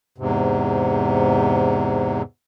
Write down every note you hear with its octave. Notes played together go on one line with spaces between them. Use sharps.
E2 G#2 C3